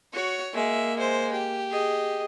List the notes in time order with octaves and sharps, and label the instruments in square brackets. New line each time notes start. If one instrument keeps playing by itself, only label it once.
[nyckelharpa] F#4 [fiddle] C#5
[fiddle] G#3 E5 [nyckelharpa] A#3
[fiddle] G#3 C5
G4
[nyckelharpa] G#4 D#5